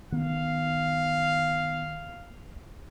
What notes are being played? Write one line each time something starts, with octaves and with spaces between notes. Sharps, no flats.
D#3 B3 F5